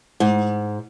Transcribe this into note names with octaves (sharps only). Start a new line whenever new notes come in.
G#2